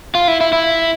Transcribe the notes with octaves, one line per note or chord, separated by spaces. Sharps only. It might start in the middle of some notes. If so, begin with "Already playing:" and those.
F4
E4
E4
E4